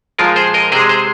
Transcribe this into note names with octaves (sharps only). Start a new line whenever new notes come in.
A#2 F3 G#3 F4 A#4
G#4 C5
A#4 D#5
C3 G#3 G#4 C5
G#4 C5